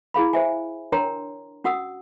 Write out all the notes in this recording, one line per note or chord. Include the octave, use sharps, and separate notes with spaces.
E4 G#4 F5 B5
C5 E5 G#5
D4 A#4 C#5 G5 A#5 C6
C#4 F#4 F#5 D#6 E6